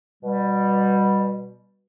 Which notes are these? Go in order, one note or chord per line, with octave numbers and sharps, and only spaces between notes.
B2 G3